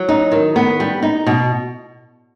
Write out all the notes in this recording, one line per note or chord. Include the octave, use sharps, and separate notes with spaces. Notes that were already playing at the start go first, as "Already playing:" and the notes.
Already playing: F#3
D#4
D#3
B3
G3
D#4
B2